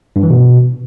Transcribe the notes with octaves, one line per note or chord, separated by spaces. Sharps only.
G2
E3
B2